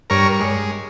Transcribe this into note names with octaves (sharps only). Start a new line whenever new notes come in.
G2 A#4 C#5
G#3